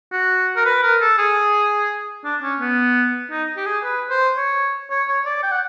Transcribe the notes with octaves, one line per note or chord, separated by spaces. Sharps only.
F#4
A#4
B4
A#4
A4
G#4
D4
C#4
B3
D#4
G4
G#4
B4
C5
C#5
C#5
C#5
D5
G5
F#5